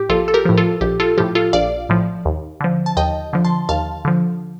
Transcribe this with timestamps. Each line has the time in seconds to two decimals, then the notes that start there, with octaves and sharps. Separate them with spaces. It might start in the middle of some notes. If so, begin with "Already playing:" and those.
Already playing: A2 G4
0.09 A#1 F4 A4
0.28 A4
0.34 G4 A#4
0.45 A2 F3
0.58 F4 A4
0.81 A#1 G4
1.00 F4 A4
1.18 A2 F3 G4
1.35 F4 A4
1.53 A#1 D5 F5
1.89 A2 F3
2.25 D#2
2.61 D3 F3
2.86 A5
2.97 D#2 D#5 G5
3.33 D3 F3
3.45 A5 C6
3.69 D#2 F5 A5
4.05 D3 F3